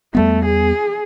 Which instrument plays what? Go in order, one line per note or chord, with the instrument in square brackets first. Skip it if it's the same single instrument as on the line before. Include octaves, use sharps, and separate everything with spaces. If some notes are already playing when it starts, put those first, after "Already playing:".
[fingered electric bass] E2 G3 B3 [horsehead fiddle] A3
[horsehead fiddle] G#4